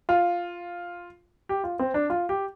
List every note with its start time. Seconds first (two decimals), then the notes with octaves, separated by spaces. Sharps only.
0.09 F4
1.49 G4
1.64 F4
1.79 C4
1.94 D4
2.10 F4
2.29 G4